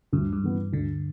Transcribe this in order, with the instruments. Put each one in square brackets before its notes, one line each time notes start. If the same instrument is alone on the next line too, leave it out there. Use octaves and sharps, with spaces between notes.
[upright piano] D2 [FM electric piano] G2
[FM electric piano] G2
[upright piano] C#3 E3 B3
[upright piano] D2 [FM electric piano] D3